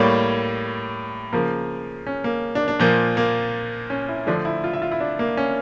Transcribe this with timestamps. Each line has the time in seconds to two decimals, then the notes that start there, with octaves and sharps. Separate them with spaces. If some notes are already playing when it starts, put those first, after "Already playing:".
Already playing: A2 G3 A#3 C#5
1.33 C#3 F3 A#3 A#4
2.07 C#4
2.24 A#3
2.55 D4
2.68 D4
2.80 A#2 F3 A#3
3.17 A#3
3.90 C#4
4.09 E4
4.26 D3 F3 A3 D4
4.45 E4
4.64 F4
4.73 E5
4.82 F4
4.91 E4
5.00 D4
5.19 A#3
5.37 C#4